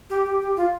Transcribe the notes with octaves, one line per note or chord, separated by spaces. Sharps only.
G4
G4
G4
F4